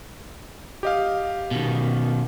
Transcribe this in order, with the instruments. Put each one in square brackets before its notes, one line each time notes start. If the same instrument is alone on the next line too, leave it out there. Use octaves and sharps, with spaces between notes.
[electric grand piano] G4 D#5 F5
[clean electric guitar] B2 D#3